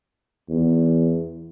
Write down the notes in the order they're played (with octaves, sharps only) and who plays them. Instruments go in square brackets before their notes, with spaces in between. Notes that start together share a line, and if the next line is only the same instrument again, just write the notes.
[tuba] E2